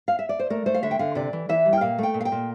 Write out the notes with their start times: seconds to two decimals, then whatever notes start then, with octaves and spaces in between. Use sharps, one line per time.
0.08 F5
0.19 E5
0.29 D5
0.39 C5
0.50 A3 A#4
0.66 A3 C5
0.74 F5
0.83 D3 E5
0.91 G5
0.99 D3 F5
1.15 C3 D5
1.33 E3
1.49 E3 E5
1.65 G3
1.73 G5
1.81 A#2 F5
1.98 A3 G5
2.14 A#2
2.21 F5
2.25 G5
2.32 A#2